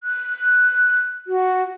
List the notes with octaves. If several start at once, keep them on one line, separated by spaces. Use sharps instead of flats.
F#6
F#4